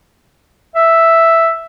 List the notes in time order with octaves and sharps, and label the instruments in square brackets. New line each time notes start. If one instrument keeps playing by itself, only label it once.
[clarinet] E5